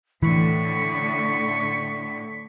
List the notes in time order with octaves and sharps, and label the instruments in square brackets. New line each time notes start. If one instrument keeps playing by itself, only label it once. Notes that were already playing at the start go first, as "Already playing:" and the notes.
[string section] A2 D3 [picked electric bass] E3 [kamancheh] C#6 [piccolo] B6